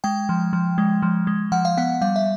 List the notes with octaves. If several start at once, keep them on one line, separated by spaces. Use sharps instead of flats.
G#3 G5
F3
F3
G#3
F3
G#3
F3 F#5
F5
B3 F#5
G3 F5
E5